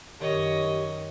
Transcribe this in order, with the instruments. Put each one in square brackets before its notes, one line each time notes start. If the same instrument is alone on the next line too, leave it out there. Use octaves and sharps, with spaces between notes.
[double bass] F#2 D#3 [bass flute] G4 [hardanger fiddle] C#5 D#5